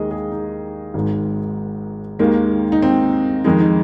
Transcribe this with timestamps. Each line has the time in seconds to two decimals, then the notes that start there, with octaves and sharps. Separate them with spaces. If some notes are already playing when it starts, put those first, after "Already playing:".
Already playing: D#2 D#3 G#3 G#4 D#5
0.11 G#4
0.32 D#4
0.94 G#1 G#2 G#3
2.19 D#2 D#3 G#3 A#3
2.72 D#4
2.82 C4
3.44 F2 D#3 G#3 D#4
3.60 D#4